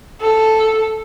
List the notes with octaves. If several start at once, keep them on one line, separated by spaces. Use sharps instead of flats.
A4